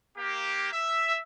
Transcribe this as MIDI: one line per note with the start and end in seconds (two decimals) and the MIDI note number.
0.17 0.71 58
0.17 0.71 67
0.73 1.21 76